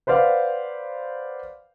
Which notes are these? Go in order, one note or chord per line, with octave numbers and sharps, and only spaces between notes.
B4 C5 D5 F5 F#5